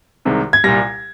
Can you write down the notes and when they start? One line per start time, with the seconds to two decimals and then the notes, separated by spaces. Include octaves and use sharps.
0.25 C2 C3 D#3 G#3
0.53 G#6
0.64 C2 A#2 G3 A#6